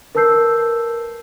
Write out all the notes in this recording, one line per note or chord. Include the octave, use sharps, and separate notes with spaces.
A#4 B4 A5 E6 G6 C7